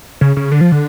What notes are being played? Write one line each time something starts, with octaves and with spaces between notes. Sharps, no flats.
C#3
C#3
D3
F3
D3